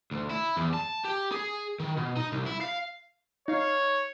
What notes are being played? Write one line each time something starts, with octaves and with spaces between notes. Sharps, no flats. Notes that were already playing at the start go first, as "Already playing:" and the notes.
D2
E4
E2
A5
G4
G#4
D#3
B2
D#4
C2
E4
F5
D#4 C#5 F5